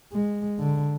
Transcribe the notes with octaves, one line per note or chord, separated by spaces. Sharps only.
G#3
D3